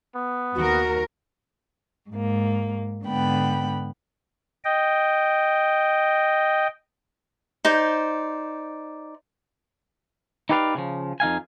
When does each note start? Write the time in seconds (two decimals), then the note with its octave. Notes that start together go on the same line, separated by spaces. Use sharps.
0.16 B3
0.55 D#2 F#4 A#4
2.10 G#2 A#3
3.05 G#2 D3 B3 G5 B5
4.64 D#5 G5
7.65 D#4 C5 D5
10.49 D#4 E4 G4 B4 D5 F5
10.75 C#3 F3
11.20 F2 D#4 F5 G#5